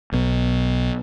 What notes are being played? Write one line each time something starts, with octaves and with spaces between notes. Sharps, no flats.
B1 B2